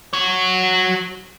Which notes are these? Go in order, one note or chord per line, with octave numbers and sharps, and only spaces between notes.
F#4 C#5